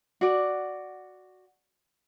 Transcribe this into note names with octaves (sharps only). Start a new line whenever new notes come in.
F#4 D5